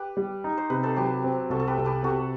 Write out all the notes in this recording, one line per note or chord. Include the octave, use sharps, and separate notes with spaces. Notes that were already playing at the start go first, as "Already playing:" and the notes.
Already playing: G4 B4
G3
D#4
C5
C3 B4
A4 C5
F#3 G4 B4
C4
C2 F#4 A4
A4
G4 B4
C2
G4 B4
C3 F#4 A4